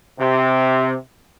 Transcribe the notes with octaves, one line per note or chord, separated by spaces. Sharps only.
C3